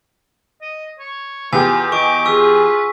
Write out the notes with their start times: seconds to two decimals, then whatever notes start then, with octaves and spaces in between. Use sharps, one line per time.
0.62 D#5
0.99 C#5
1.53 E2 F4 G4 G#5
1.92 D#5 C#6 D6
2.25 F4 G#4 B4 C#6 E6